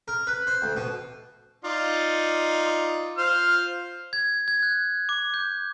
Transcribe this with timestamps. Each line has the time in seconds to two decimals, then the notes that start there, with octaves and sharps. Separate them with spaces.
0.08 A#4
0.27 B4
0.47 C5
0.62 D2
0.77 B2
1.65 D#4 F4 D5
3.18 F4 C5 F6
4.13 G#6
4.48 G#6
4.63 F#6
5.09 D6
5.34 G6